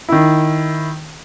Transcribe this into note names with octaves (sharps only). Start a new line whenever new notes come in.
D#3 E4